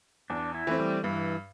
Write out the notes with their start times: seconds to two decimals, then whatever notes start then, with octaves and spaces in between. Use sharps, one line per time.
0.30 E2 D4
0.55 E4
0.67 E3 A3 C4
0.79 G3
1.03 G2 E3